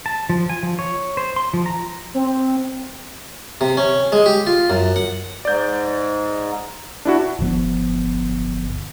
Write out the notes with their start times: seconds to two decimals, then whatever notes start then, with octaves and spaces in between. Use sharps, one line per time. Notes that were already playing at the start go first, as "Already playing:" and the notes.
0.06 A5
0.29 F3
0.50 G#5
0.63 F3
0.79 C#5
1.17 C5
1.36 C6
1.54 F3
1.66 A#5
2.14 C4
3.61 C3
3.77 C#4
4.12 G#3
4.26 G4
4.47 F4
4.70 F#2
4.96 F#5
5.45 G#2 D5 G6
7.05 D4 E4 F#4
7.39 D1 G1 F3 B3